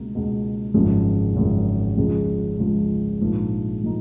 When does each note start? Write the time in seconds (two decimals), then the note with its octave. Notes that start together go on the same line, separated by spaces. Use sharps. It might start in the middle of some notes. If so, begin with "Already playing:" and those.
Already playing: C#2 B2 A#3
0.12 C#2 B2 A#3
0.74 G#1 F#2 C#3 F3 G#3
1.35 G#1 F#2 C#3 F3 G#3
1.97 C#2 C#3 F3 G#3
2.58 C#2 C#3 F3 G#3
3.21 A#1 G#2 F3 A#3 D#4
3.83 F3 A#3 D#4